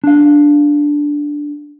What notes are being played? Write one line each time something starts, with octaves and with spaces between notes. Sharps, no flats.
D4 F5